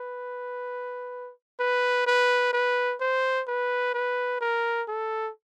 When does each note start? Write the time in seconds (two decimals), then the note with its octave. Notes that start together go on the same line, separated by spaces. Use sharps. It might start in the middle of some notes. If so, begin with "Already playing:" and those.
Already playing: B4
1.60 B4
2.07 B4
2.53 B4
3.00 C5
3.48 B4
3.94 B4
4.41 A#4
4.88 A4